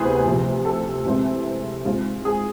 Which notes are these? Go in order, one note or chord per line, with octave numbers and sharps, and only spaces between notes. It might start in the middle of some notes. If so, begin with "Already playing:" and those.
Already playing: D2 C3 E3 B3 G#4 B4 C5
D2 C3 F3
A4
C3 E3 G#3 C4 E4
G#2 G#3 C4 F4
G#4